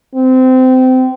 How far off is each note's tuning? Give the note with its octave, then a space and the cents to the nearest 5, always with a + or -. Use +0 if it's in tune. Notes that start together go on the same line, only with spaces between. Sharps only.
C4 -25